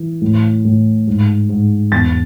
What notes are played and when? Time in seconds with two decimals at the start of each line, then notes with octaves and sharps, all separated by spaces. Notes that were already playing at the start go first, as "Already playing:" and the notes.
Already playing: E3
0.22 A2
0.65 A2
1.07 G#2
1.49 G#2
1.92 E2 A6